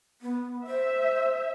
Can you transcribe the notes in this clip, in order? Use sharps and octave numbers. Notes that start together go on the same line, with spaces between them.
B3
C5 E5